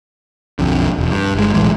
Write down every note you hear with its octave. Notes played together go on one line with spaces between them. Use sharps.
B1 F2 D3
E1
G2
G1 G#3
B1 A2 E3 G#3